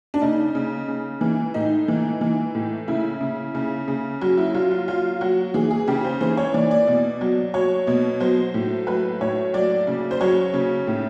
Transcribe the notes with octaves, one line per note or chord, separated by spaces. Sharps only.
D4
C#3 D#4
C#3
C#3
E3
A2 D#4
E3
E3
A2
C#3 E4
C#3
C#3
C#3
F#3
E4
F#3 F4
F4
F#3 F4
F#3 F#4
E3 G#4
G#4
C#3 G4
C5
E3 C5
C#5
E3 D5
D5
B2
F#3
F#3 C#5
B2
F#3 C5
A2
F#3 B4
A2 C#5
F#3 D5
C#3
C5
F#3 C#5
C#3
A2